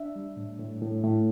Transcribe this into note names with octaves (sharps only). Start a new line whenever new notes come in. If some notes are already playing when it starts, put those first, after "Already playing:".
Already playing: D4 E5
G3
A2
A2
A2
A2